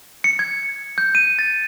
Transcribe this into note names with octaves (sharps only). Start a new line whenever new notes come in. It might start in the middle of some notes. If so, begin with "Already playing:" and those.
C#7
G#6
G6
D#7
A6